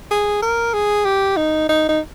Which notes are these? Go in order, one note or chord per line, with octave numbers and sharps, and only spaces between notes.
G#4
A#4
G#4
G4
D#4
D#4
D#4